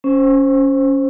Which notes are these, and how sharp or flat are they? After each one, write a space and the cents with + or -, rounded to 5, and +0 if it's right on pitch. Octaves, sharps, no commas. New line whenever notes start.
C#4 +0 C5 +5